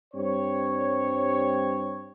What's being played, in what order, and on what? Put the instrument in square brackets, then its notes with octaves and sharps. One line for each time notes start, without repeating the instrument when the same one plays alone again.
[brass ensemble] G2 G3 C4 C#5